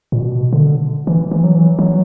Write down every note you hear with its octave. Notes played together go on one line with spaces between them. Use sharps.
A#2
B2
D3
E3
E3
F#3
E3
F#3